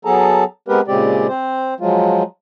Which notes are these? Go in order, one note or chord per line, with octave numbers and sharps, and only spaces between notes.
F#3 B3 G#4 A4 A5 A#5
G#3 B3 C4 G4 A#4 B4
A#2 C#3 G#3 C4 G4 D5
C4 C5
F3 F#3 G#3 F4